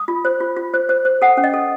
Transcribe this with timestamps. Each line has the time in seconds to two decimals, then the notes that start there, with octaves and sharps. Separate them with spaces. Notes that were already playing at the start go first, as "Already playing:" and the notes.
Already playing: D#6
0.08 F4
0.25 C5
0.40 F4
0.56 F4
0.74 C5
0.89 C5
1.05 C5
1.22 A4 F#5
1.37 C#4
1.44 D#5
1.54 A4